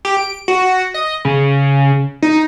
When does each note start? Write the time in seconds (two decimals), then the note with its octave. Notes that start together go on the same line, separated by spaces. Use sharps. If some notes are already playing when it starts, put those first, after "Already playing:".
0.05 G4
0.17 D7
0.48 F#4
0.94 D#5
1.25 C#3
2.22 D#4